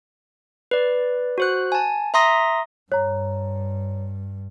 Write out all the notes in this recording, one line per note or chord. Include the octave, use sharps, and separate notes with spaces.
B4 D5
F#4 C5 F#6
G#5 A5
E5 A#5 C6 D#6 A#6
G2 C#5 A#5